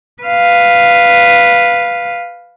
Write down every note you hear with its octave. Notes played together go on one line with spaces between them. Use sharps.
B4 F5